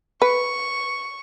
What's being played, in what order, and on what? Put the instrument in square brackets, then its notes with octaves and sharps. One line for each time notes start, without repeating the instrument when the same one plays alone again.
[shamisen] B4 [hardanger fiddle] C#6